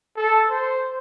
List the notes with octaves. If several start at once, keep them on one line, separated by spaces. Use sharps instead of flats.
A4
C5